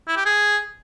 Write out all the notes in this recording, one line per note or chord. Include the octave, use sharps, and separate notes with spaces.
E4
G4
G#4